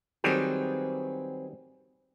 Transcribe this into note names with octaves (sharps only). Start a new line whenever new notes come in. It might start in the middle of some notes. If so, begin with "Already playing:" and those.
D#3 F#3 G3 C4 G#4 B4